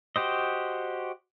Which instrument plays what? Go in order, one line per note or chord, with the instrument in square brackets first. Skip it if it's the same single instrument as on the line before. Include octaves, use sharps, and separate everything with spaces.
[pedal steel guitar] F#4 G4 C5 D#5